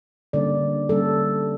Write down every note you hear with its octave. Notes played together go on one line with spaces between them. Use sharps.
D3 G3 A#3 C#4 D5
D3 G3 A#3 C#4 A4